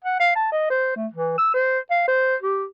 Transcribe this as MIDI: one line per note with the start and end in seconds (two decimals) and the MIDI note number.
0.04 0.18 78
0.20 0.31 77
0.36 0.49 81
0.52 0.67 75
0.70 0.94 72
0.96 1.07 57
1.13 1.35 52
1.38 1.49 88
1.54 1.79 72
1.91 2.07 77
2.08 2.36 72
2.42 2.65 67